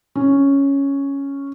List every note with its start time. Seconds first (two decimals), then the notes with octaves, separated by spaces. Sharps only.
0.15 C#4